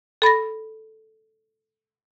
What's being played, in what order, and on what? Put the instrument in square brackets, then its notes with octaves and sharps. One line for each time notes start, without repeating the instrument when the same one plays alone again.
[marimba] A4 B5 A6 A#6